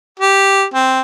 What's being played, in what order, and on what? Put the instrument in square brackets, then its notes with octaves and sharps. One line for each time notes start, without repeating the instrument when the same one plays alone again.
[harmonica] G4
C4